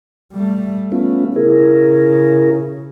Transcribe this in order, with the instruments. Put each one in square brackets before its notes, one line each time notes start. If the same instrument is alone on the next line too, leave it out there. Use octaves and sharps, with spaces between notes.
[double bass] G3 A3
[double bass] A3 [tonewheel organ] B3 C#4 F4
[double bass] C#3 [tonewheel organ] E4 G#4 A#4